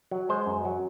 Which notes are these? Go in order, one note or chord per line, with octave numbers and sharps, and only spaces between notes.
F#3
G#3 C5
F#2
F#3